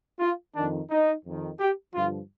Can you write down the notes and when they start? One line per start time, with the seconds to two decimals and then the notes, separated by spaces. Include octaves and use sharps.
0.20 F4
0.55 F2 D#3 D4
0.90 D#4
1.25 F2 D#3
1.60 G4
1.94 G2 D3 F3 F4